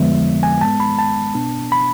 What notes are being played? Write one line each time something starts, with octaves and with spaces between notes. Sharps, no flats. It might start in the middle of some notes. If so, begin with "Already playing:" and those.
Already playing: F2 D3 F3 G#3 B3 E5
G#5
G#2 G#3 B3 A5
B5
A5
B2 B3 D4
B5